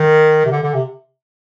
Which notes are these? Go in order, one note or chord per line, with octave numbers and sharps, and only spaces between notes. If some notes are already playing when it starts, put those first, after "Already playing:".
Already playing: D#3
C3
D3
D3
C3